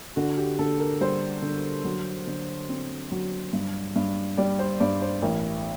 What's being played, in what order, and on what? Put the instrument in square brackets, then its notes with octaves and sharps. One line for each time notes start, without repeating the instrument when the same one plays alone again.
[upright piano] D3 [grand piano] F#4
[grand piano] G4
[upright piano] D3 [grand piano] A4
[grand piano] A#4
[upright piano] G3 [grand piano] C5
[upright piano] D3
F#3
D3
C4
F#3
G2
G2
[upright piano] G3 [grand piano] D5
[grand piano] C5
[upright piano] G2 [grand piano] D5
[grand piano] C5
[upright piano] A1 [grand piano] A#4